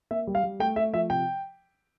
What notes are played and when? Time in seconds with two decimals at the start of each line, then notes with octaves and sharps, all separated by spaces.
0.11 A#3 E5
0.27 G3
0.35 F5
0.43 G3
0.60 A3 G5
0.76 A3 E5
0.93 F3 E5
1.10 C3 G5